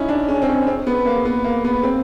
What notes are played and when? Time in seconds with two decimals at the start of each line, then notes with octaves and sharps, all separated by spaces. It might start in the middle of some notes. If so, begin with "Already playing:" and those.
Already playing: C#4 D#4 E4
0.09 D4
0.28 C#4
0.42 C4
0.48 C#4
0.67 C4
0.87 B3
1.06 A#3
1.25 B3
1.44 A#3
1.64 B3
1.83 C4